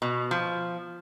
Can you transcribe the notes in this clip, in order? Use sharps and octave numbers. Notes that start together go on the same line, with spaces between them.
B2
F3